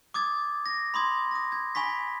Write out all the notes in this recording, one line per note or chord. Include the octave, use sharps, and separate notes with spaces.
D6 D#6 G#6 A6
A#6
B5 C6 D#6 G#6
D#6 A#6
G#6
G#5 B5 C#6 B6